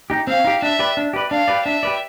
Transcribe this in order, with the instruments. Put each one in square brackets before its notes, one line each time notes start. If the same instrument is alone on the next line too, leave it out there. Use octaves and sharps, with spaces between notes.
[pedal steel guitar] D#4 G4
[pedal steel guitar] C4 [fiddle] F5
[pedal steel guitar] D#4 G4
[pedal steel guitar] D4 [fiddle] E5
[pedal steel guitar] G4 B4 D5
D4
G4 B4 D5
[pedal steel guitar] D4 [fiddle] F5
[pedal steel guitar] G4 B4 D5
[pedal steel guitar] D4 [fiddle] E5
[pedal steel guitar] G4 B4 D5